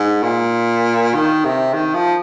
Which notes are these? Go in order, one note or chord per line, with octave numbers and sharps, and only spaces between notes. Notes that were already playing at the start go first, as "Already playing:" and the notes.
Already playing: G#2
A#2
D#3
C3
D#3
F3